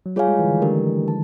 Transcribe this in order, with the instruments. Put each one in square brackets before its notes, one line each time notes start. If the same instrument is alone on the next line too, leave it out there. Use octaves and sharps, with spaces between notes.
[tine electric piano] F#3
[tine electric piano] G3 [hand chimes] F4 G#4 C#5 F5 G#5
[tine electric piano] G#3
E3
D3
D#3
[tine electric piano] D3 [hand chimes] A3 D4 G4 A#4
[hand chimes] A5